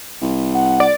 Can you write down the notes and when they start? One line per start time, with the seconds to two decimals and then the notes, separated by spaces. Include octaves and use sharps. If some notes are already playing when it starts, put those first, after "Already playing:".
0.22 C2
0.54 F#5
0.80 D5